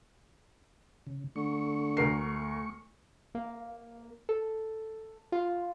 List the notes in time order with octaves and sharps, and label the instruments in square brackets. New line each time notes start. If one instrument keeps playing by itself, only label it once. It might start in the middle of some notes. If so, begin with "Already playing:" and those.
[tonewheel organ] C#3
[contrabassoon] D3 [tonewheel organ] A3 C#6
[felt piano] D2 A#4 C7
[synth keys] A#3
A4
F4